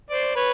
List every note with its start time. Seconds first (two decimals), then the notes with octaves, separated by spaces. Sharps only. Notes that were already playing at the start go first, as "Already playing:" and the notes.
0.10 C5 D5
0.35 B4 C#5